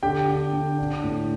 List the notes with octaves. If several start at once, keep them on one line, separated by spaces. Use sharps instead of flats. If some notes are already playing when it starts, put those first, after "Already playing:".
D3 G4 G5
D3
D3
D4
A2